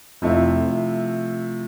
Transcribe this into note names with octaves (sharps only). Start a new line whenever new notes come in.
F2 C3 F3 A3 E4